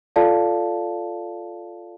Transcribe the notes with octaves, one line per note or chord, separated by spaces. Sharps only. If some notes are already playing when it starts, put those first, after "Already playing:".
F4 A4 D5 F5 A5